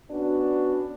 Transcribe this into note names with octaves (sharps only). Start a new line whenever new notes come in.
B3 C#4 D4 F#4